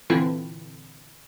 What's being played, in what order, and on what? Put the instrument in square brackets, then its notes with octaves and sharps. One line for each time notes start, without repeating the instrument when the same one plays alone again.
[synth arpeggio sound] A#2 D3 E3 C4 E4 F4